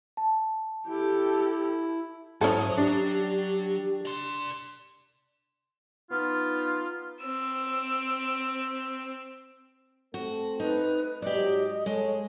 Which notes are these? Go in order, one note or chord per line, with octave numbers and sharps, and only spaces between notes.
A5
E4 G4 A4
G#2 F#3 C#4 E4 F#4 A4 C5 D#6
D4 G4
D5 C6
B3 D#4 F4
C4 E6
A3 C4 F#4 A4
D#4 B4
G#2 F#3 G4 D5 D#5
G#3 A4 C#5